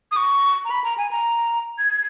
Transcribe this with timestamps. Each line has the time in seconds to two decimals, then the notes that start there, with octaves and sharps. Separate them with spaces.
0.11 D#6
0.16 C#6
0.65 A#5
0.70 B5
0.84 A#5
0.98 G#5
1.11 A#5
1.79 G#6